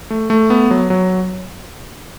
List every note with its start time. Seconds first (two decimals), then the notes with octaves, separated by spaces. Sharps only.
0.10 A3
0.30 A3
0.50 B3
0.71 F#3
0.90 F#3